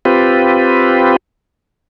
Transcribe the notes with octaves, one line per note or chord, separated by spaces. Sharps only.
C4 F4 G4 B4